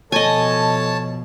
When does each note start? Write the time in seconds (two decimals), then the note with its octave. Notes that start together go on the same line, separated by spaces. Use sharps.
0.12 B2 F3 A4 C#5 D#5 G#5 A5